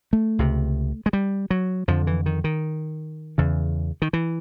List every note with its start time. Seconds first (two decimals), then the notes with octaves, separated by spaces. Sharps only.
0.13 A3
0.39 C#2 C3
1.06 G#3
1.13 G3
1.50 F#3
1.88 F2 D3 F3
2.07 E3
2.26 D#3
2.44 D#3
3.38 E2 C#3
4.02 D#3
4.13 E3